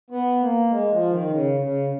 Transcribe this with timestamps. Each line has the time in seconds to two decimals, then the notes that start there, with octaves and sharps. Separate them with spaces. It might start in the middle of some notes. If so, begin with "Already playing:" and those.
0.10 B3
0.40 A#3
0.70 G#3
0.90 F3
1.10 D#3
1.30 C#3
1.60 C#3